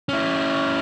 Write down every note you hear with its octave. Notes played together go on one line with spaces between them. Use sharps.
C#4 E4